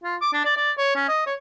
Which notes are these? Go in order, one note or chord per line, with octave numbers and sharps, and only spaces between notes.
F4
D6
D4
D5
D5
C#5
C#4
D#5
C#5